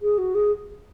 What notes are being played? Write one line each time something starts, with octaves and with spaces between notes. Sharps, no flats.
G#4
F#4
G#4